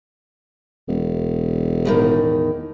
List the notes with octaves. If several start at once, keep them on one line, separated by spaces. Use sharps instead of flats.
E1
E2 A2 D#3